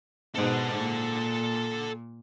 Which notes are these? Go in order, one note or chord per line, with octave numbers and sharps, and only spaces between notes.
G#2 B2 A4 F#5
A#2